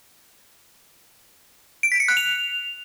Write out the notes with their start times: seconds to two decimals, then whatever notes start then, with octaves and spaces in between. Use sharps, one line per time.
1.83 D7
1.92 B6
2.00 C#7
2.08 F#6
2.17 F7